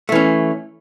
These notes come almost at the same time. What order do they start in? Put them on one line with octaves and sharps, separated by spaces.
A3 E3 C#4